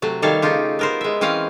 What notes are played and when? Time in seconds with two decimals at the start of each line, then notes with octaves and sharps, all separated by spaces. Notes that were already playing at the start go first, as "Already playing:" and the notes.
0.02 C3 F#3 A3
0.22 D#3 G3 A4 C#5 F5
0.42 C#3 D#4 F4 G4
0.79 B3 A#4 C5
1.01 G#3 E5
1.21 E3 C4 C#4 F5